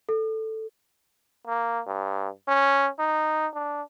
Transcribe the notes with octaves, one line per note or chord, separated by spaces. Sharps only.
A4
A#3
G2
C#4
D#4
D4